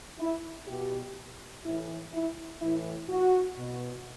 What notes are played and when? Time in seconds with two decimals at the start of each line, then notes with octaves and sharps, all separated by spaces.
0.19 E4
0.68 B2 G4
1.65 A2 E3 E4
2.13 E4
2.61 A2 E3 E4
3.09 F#4
3.58 B2